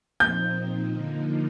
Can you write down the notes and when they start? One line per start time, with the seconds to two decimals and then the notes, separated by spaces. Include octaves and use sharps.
0.20 A#2 F3 C4 D#4 G6
0.92 D3 F3 A#3 D#4